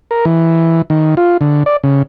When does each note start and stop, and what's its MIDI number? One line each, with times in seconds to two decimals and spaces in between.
0.11 0.25 70
0.25 0.82 52
0.90 1.15 51
1.17 1.37 65
1.41 1.63 50
1.66 1.77 74
1.84 2.02 49